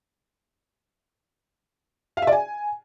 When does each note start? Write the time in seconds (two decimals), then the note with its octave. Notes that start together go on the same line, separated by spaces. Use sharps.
2.17 F5
2.22 E5
2.27 D5
2.32 G#5